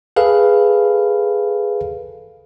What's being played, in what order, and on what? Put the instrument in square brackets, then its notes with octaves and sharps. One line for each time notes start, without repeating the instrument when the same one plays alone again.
[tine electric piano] G#4 A4 B4 F5